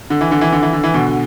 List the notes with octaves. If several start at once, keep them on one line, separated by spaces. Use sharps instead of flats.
D3
E3
D3
E3
D3
E3
D3
E3
B2 D3